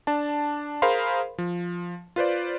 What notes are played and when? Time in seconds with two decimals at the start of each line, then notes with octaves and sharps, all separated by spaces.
0.07 D4 A5
0.82 G#4 A#4 C5 F5 B5 C6
1.38 F3
2.16 F4 B4 C5 D5